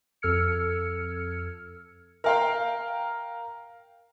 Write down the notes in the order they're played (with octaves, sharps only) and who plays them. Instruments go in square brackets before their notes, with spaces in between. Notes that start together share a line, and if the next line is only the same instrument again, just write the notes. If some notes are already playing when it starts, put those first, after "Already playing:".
[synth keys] F2 A4 E6 F6 G#6 C#7
[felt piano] A#4 F5 G5